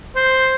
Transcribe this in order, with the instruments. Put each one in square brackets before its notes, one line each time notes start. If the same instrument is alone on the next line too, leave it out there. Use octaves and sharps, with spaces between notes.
[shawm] C5